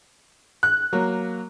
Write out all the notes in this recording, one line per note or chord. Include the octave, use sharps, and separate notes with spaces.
F#6
F#3 A#3